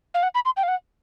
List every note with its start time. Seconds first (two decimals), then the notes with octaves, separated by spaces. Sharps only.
0.14 F5
0.23 F#5
0.35 B5
0.45 C6
0.57 G5
0.63 F5
0.68 F#5